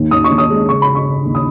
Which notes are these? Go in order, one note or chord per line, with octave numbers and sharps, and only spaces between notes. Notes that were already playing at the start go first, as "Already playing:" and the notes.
Already playing: D#2 D#3
D#2 D#6
C#6
D#2
D#6
G#3
C#3 C#6
B5
C#3
C#6
C#3
D#2
D#6